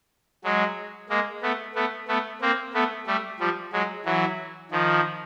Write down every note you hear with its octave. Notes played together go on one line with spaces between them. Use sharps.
F#3 G#3
G#3 A#3
A3 B3
A3 B3
A3 B3
A#3 C4
A3 B3
G3 A3
F3 G3
F#3 G#3
E3 F#3
D#3 F3